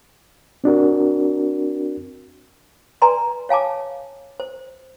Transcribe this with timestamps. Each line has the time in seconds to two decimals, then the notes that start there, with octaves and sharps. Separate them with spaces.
0.64 C4 D4 F#4 A#4
3.02 B4 D5 G#5 A#5 C6
3.49 C#5 F5 G#5 A5 D6
4.40 C5